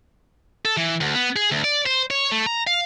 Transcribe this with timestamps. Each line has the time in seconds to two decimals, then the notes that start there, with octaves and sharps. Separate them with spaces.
0.65 A4
0.77 E3
1.01 D2
1.15 B3
1.36 G#4
1.51 D2
1.64 D5
1.86 C5
2.10 C#5
2.32 A3
2.46 A#5
2.67 F5